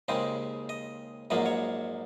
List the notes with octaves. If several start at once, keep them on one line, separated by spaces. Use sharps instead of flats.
D#2 C#3 G#3 C4 D#5
D#5
A#1 G#2 F#3 A#3 D#5
C#5